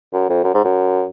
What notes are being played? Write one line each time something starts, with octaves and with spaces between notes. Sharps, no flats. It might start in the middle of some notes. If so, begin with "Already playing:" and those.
F#2
F2
F#2
G#2
F#2